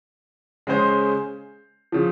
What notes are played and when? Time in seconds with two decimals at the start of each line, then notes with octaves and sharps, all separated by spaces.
0.67 C#3 G#3 C#4 G#4 C5
1.92 C#3 F3